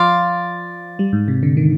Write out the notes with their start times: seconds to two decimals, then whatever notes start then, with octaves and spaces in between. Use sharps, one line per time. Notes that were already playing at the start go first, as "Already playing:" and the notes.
Already playing: F3 D5 F5 C6
0.99 G3
1.13 G#2
1.28 C3
1.43 D3
1.57 D#3